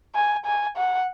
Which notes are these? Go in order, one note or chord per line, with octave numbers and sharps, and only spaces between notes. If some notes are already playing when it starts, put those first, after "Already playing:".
G#5
G#5
F#5